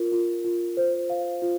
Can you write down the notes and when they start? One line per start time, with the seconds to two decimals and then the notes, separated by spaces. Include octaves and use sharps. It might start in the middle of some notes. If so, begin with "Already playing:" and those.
Already playing: F4 A#4
0.12 F4
0.45 F4
0.77 C5
1.10 F5
1.42 F4